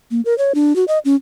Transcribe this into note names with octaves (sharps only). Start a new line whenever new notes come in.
A#3
A#4
C#5
D4
F#4
D#5
C#4